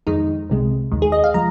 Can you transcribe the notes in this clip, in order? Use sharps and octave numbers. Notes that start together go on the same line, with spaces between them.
F2 D#3 G#3 D#4
C2 C3 G#3
D#2 D#3 G#3
G#4
D#5
F5
F3 G#3 A#5